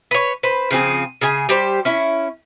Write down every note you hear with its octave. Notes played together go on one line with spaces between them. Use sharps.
B4 C#5
B4 C5
C#3 F3 C4 G#4
C#3 G#4 G#5
G3 G4 C5
C#4 E4